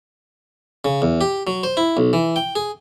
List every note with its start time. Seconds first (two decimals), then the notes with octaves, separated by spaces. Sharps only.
0.85 C#3
1.02 E2
1.21 G4
1.47 F#3
1.63 C5
1.77 E4
1.97 B1
2.13 E3
2.36 G5
2.56 G#4